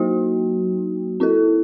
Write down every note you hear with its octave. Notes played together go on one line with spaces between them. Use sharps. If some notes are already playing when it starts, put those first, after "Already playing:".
Already playing: F#3 A#3 D#4 F#4
C4 E4 A4